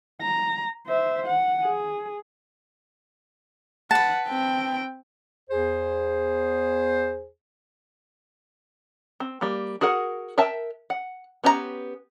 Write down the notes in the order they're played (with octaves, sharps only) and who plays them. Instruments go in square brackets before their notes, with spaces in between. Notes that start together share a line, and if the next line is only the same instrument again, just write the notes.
[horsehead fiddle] A#5
C5 E5
F#5
G#4
[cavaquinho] B4 A5 [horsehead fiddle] F#5
[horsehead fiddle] C4 G5
[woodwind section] E2 G#4 C5
[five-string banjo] C4
G3 A#3
F#4 G#4 A#4 F#5
A#4 E5 G5 A5
F#5
B3 C#4 G4 D#5 A#5